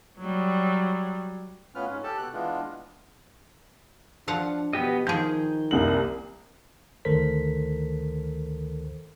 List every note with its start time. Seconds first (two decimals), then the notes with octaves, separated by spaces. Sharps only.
0.19 F#3 G3
1.75 A2 B3 C#4 F4 B4 F6
1.90 G#2 C#4
2.03 G4 A4 A5
2.18 B2 F#6
2.33 E3 G#3 B3 D4 F4
4.28 F3 D4 F5 F#5
4.73 B2 B3 G4 D#5
5.07 D#3 F3 G#4 G6
5.71 C2 A#3 F#7
7.05 D2 D#3 A4 A#4 C5 B6